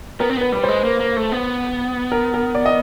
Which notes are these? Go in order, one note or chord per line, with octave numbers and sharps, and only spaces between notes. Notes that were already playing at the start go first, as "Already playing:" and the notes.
B3 A#4
C4
B3 B4
G3 B4
G#3 C5
A#3
A#3
A3
B3
A#4
A#4
D5
D#5